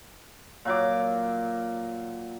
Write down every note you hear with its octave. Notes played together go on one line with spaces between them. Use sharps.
A#2 F#3 D6